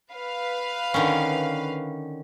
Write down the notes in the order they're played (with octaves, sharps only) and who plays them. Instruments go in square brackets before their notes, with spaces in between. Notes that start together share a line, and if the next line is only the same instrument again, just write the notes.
[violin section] B4 F5
[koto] D3 D#3 C#4